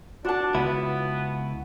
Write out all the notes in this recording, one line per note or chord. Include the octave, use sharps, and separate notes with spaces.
D4 F#4 A5
C#2 B3 E4